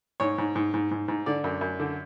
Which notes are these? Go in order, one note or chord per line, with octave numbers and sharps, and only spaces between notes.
G#2 C#5
G#2
G#2
G#2
G#2
G#2
D3 D5
F#2
F#2
D3